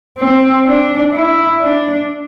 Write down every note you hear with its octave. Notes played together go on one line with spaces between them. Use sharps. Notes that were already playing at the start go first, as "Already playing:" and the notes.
C4
D4
E4
D4